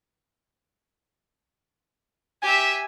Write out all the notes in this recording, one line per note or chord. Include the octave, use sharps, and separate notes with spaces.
G4 E5 G#5